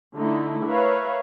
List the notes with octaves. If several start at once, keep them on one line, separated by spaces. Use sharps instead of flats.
D3 A3 D#4 E4
A#4 B4 C#5 E5 F5